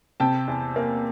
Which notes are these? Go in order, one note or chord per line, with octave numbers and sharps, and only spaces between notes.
C3 G5 A5
E2
A#3